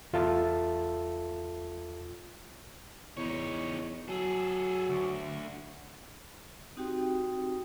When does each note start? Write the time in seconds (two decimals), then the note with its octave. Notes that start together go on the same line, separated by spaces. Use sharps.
0.13 E2 F4 A4 E5 A5
3.17 E2 D#4 C#5
4.08 F#3 G#4 A4
4.90 D2
6.77 C4 D#4 F#4 G4 G5 D#6